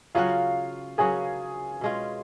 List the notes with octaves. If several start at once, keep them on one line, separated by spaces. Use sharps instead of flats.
C#3 F#3 C#4 F4 F#4 F5
C#3 F#3 C#4 F#4 G#4 G#5
B2 G#3 C#4 F4